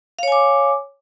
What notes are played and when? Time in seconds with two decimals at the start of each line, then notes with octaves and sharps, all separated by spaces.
0.19 F5
0.23 C#5
0.28 G#5
0.32 D6